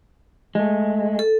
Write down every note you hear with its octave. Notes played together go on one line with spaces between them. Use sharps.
G#3 A3
A4